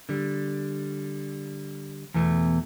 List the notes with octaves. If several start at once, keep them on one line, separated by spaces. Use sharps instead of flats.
D3 G3
E2 B2 E3 A3